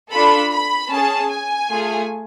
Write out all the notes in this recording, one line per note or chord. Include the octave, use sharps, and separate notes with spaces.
D4 F4 A4 B5
B5
C#4 G#4 A5
G#5
A3 F4 G#4